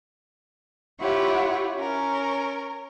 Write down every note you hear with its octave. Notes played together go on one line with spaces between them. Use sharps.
E4 F4 G4 C#5 F#5
C#4 A#4